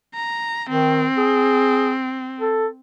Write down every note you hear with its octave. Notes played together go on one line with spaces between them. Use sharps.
A#5
D#3 C4
G#4
A4